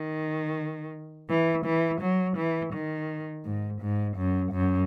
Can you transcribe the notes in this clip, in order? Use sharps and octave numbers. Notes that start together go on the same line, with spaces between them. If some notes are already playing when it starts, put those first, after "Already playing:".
Already playing: D#3
E3
E3
F#3
E3
D#3
G#2
G#2
F#2
F#2